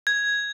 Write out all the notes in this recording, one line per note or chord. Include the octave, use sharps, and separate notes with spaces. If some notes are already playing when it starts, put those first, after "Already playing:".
G#6